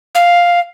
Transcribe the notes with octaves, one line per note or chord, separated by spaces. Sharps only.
F5